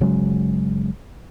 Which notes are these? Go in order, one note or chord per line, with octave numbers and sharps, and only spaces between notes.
G1 C#3 F#3 G#3